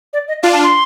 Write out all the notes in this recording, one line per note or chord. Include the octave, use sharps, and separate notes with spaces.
D5
D#5
D4 F4 F5
A5
C6